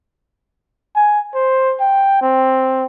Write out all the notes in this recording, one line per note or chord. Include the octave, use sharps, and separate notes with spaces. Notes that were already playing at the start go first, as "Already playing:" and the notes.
G#5
C5
G5
C4